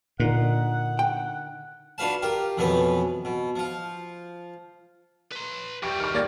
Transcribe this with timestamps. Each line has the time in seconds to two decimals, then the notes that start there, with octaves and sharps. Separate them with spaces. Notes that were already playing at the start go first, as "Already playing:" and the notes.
0.20 A#2 D3 D#4 A#4 F#5
0.99 G5
1.98 D4 F4 F#4 B4 F5 A5
2.22 F4 G4 A#4
2.57 F2 B2 E3 F#3 B3 B4
3.25 B2
3.56 F3 F4
5.31 B4 C6
5.83 E3 G3 G4 C#6 G6
6.00 D#3 C#6 F6
6.14 A#3 G4 D5 A6